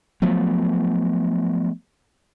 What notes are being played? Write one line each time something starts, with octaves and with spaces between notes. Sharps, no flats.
F3 F#3 A3 B3